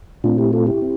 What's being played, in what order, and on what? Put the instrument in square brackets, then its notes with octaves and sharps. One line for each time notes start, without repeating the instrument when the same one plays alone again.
[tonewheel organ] A#2 A3 C4 D4 F4
E4 G4
F4 A4
E4 G4
C4